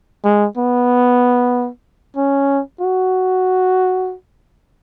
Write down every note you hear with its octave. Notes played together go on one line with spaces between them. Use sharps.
G#3
B3
C#4
F#4